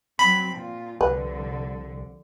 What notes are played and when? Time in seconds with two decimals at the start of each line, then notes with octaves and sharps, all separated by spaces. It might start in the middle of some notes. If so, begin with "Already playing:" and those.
0.19 F#3 C4 B5
0.54 A#2 F4
1.01 C2 D3 F3 B4